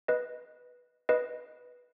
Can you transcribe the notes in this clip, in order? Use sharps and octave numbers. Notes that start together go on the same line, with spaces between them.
B4 D#5
B4 D#5